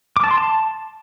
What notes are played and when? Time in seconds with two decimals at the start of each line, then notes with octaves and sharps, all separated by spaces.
0.17 D6
0.24 A5
0.31 C6
0.38 A5